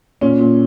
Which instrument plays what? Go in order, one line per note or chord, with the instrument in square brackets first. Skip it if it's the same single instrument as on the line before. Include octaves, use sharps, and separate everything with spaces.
[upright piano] A#2 C#4
A#2